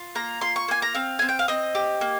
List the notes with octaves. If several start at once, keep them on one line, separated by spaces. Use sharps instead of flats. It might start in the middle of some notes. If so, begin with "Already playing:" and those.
Already playing: F4
A#3 A#5
F4 C6
C#6
A#3 G#5
A#5
C4 F5
C4 G#5
G5
F5
C4 D#5
G4
A#3